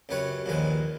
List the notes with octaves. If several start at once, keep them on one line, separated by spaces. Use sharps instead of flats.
C#2 F#2 G4 B4 C#5
A#1 D#2 A#2 D#3 G#3 B4